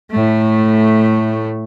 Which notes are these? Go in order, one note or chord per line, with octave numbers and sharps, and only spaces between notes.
A2 A3